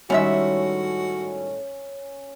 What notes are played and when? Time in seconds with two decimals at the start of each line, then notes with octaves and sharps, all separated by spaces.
0.10 A2 D#3 G3 G#3 C#4 F#4 E5